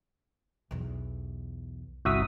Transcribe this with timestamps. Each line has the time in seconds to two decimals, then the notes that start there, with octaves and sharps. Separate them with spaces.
0.71 B1 E2
2.05 G1 C2 F#4 E5 D#6 B6